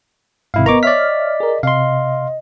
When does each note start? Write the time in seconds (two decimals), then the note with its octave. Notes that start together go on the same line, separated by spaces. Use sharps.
0.54 G#1 G#2 C3 E4 F5
0.66 B3 A#4 D#5 A#5 C#6 D6
0.83 C#5 D5 E5 F6 B6
1.40 G#4 A#4
1.63 C3 D#5 F5 C6